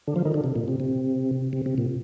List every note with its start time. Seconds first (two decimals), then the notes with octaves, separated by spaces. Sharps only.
0.08 D3
0.16 F3
0.25 D#3
0.34 D3
0.44 C3
0.55 A#2
0.68 C3
0.80 C3
1.53 C3
1.66 C3
1.78 A#2